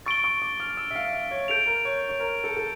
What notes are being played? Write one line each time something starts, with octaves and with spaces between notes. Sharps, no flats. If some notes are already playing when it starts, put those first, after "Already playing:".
C#6 A6 D7 G7
C#6
D6
F6
E6
E5
F5
E5
C#5
A4 G6 D7 F7
A#4
C#5
C#5
A#4
A4
A4